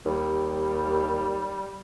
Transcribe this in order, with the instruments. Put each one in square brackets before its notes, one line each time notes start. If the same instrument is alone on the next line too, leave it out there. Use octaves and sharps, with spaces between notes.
[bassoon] D#2 [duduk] G3